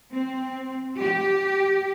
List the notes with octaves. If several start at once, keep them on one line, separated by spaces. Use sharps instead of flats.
C4
G4